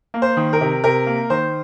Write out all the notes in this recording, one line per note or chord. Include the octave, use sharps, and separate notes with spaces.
A#3
C5
D#3
A#4
C3
C3 A#4
A#3
D#3 C5